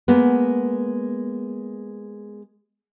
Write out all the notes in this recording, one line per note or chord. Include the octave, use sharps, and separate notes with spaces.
G#3 A#3 B3